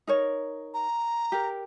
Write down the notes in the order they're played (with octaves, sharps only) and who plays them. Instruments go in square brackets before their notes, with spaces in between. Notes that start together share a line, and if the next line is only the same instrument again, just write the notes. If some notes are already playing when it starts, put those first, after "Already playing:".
[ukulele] D#4 A#4 C#5
[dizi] A#5
[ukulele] G4 A#4